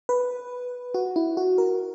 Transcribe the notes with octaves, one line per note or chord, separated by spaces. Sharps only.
B4
F#4
E4
F#4
A#4